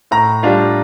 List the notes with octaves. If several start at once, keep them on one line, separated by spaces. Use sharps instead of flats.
A2 A#5
G3 D4 F4